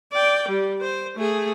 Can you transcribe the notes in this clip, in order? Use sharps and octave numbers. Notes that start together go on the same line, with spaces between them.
D5 G5
G3
C5
A3 G#4